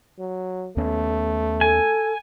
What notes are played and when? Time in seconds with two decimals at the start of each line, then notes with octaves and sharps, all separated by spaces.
0.19 F#3
0.77 D#2 A3 B3 C#4
1.61 A4 G#5